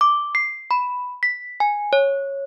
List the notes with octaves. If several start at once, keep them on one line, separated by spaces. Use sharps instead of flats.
D6
C7
B5
B6
G#5
C#5